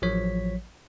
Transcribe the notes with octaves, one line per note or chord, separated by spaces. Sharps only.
A1 F3 F#3 C#5 B6